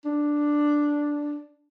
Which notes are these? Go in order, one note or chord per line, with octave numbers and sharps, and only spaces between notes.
D4